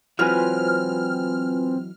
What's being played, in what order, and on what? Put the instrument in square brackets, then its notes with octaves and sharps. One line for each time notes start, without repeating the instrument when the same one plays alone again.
[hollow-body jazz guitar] E3 F#3 G#3 [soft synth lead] C4 [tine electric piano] F4 B4 G#5 [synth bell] F6